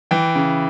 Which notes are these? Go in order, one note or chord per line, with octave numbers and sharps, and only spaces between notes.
E3 G5
C#3